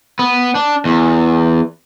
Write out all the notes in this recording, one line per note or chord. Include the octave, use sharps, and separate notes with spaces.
B3
D4
E2